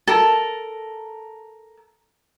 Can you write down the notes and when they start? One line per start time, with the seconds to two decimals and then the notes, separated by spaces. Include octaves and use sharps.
0.07 A4 A#4